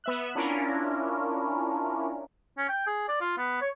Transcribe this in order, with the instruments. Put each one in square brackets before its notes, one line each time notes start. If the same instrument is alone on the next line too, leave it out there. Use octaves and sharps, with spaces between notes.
[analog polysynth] B3 E5 F#6
C#4 D4 E4 F4 A#4
[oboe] C#4
G5
G#4
D5
F4
B3
C#5